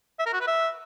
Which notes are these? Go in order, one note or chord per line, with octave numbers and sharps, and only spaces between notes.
E5
A#4
F#4
B4
E5